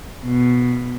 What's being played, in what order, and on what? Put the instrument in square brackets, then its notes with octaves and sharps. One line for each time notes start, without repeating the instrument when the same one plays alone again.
[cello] B2